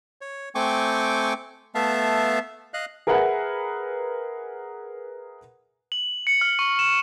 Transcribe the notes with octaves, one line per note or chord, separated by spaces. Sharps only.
C#5
A3 C4 G5 G#5 C#6 D6
A3 B3 E5 F5 A5
D#5 F5 F#6
G#4 A#4 B4 E5 F#5 G#5
F#7
C#7
F6
C#6
E7